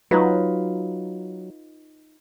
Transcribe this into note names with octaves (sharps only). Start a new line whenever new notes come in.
F#3 D#4 F4 B4